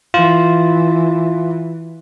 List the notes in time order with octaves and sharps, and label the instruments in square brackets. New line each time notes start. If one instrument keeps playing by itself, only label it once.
[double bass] E3 [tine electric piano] F4